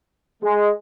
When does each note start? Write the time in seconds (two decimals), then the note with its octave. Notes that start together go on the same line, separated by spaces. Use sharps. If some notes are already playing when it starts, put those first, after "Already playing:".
0.43 G#3